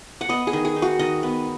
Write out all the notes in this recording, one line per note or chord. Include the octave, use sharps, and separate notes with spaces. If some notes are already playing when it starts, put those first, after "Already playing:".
F#5
B3 D#5
G#4
D#3
G#4
D#4
F#4
D#3 D#5
B3